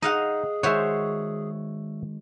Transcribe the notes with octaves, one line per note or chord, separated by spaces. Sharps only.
D#4 G#4 D#5 F5 F#5
D#3 G#3 F#4 C5 C#5 E5